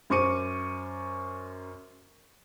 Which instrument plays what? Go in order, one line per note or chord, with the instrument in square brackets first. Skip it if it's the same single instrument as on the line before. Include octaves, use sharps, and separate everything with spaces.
[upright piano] F#2 C5 C#6 D6 C#7 D#7